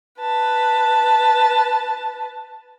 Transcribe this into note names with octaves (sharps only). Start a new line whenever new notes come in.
B4 A5